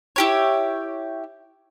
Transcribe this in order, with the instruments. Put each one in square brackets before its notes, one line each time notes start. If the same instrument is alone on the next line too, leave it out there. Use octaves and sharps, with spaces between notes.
[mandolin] E4 G4 C#5